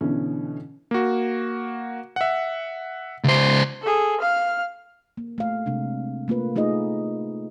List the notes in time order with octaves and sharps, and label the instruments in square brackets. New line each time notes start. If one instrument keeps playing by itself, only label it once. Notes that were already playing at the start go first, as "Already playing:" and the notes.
[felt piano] B2 D3 E3 C#4
[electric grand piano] A#3 F#4
E5 F#5
[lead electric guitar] C#2 C5
[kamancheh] G#4 A4
F5 F6
[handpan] A#3
A3 F5
C3 G#3 A#3 D4
A3 A#3 F4 B4
A3 D#4 F4 G#4 D#5